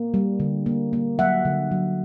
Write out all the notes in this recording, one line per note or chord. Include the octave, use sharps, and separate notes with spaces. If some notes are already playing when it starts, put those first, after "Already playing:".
Already playing: A#3
G3
D3
A#3
A#3
F#3 E5 F#5
D3
F#3